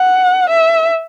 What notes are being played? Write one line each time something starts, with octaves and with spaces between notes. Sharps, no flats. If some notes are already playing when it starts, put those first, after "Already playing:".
Already playing: F#5
E5